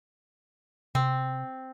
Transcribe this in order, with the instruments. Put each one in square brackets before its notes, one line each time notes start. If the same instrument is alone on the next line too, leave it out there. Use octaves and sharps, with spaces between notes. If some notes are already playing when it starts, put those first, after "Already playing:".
[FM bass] C3 [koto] C4